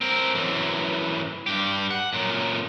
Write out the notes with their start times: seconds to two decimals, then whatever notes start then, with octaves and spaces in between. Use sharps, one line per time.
0.01 C4 A#4
0.34 F#2 E3
1.46 G2 G4
1.91 F#5
2.13 F#2 A#2